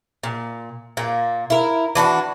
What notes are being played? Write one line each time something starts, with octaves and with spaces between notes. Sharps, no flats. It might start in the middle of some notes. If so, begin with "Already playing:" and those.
A#2
A#2 A#3
E4 A#4
E3 D4 F4 F#4